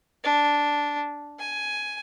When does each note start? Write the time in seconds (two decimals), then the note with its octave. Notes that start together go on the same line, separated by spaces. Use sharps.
0.24 D4
1.39 G#5